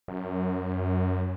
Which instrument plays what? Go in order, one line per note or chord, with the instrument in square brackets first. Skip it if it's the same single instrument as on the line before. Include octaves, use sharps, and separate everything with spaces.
[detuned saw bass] F#2